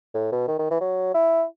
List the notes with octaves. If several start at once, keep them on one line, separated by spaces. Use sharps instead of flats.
A2
B2
D#3
D#3
E3
F#3
E4